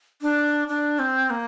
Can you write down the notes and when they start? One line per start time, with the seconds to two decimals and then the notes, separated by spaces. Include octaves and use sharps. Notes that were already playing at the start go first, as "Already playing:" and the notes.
0.22 D4
0.68 D4
0.99 C4
1.30 A#3